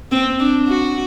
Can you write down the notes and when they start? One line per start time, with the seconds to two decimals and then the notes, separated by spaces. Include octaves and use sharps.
0.12 C4
0.40 D4
0.68 F#4